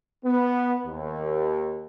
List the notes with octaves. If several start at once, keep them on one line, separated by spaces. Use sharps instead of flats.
B3
D#2